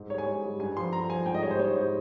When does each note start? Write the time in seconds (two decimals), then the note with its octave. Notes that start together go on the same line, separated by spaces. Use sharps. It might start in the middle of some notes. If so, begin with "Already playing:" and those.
Already playing: G#2
0.10 G3 C#5
0.18 G#5
0.27 G#2
0.43 G3
0.60 G2 G#5
0.76 F3 C6
0.93 G2 A#5
1.09 F3 G#5
1.26 G#2 G5
1.35 D#5
1.43 G3 C#5
1.51 C5
1.59 G#2 C#5
1.76 G3 C5